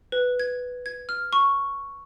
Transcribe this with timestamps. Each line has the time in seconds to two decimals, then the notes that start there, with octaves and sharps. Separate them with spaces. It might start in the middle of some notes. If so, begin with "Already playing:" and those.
0.12 B4
0.40 G#6
0.86 G#6
1.09 F6
1.33 C#6